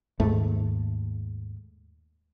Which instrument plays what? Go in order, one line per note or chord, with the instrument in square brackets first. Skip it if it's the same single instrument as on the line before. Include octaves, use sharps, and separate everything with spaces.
[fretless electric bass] D#2 G#2 A3